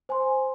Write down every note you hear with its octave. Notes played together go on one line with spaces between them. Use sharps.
C5 G#5 C6